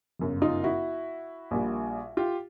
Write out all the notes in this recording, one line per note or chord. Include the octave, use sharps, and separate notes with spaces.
G1 F#2 C#3
D#4 F4
E4 F#4
A#1 A#2 G3
F4 G4